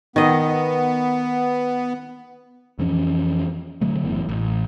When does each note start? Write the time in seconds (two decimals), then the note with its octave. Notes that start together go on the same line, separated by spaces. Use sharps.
0.16 D#3 B3 D#5
2.79 F2 E3 F3 C#4
3.81 D3 F#3 A3
4.04 F#1 E2 A2
4.29 A1